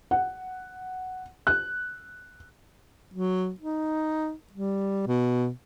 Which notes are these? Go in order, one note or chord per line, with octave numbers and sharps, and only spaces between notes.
F#5
F#6
F#3
D#4
G3
B2